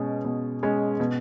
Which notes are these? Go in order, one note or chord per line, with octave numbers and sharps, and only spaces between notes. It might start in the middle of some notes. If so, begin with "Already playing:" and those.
Already playing: B2 G#3 C#4
B2
G#3 C#4
B2